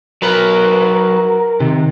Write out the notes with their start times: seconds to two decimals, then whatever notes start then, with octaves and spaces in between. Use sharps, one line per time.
0.22 F#3 A#4 B4
1.60 C3 D#3